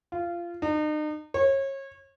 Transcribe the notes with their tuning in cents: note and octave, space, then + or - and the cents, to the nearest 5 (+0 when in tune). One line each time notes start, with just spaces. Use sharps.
F4 -20
D#4 -40
C#5 -30